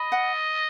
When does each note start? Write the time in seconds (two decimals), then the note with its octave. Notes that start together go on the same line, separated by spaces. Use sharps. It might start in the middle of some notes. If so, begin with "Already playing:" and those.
Already playing: D#5 B5
0.12 F#5